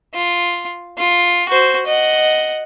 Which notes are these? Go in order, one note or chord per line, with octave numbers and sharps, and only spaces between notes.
F4
F4
F#4 C5
D#5 F#5